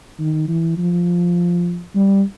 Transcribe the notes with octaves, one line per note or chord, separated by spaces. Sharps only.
D#3
E3
F3
G3